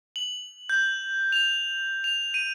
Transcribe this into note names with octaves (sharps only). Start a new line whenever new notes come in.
F#7
G6
F7
F7
D#7